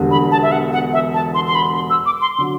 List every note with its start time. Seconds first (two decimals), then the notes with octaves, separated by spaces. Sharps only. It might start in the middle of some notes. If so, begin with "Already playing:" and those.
Already playing: E1 E2 D3 G3
0.11 B5
0.31 A5
0.43 E5
0.52 F#5
0.72 F#5
0.93 E5
1.14 A5
1.34 C6
1.47 C6
1.55 B5
1.75 C6
1.90 E6
2.06 D6
2.21 C6
2.36 D3 F#3 C6